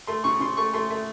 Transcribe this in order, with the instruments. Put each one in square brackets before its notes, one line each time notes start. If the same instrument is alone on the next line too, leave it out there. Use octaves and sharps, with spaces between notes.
[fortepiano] A3 C6
C#3 C#6
C#3 C6
A3 C#6
A3 C6
A3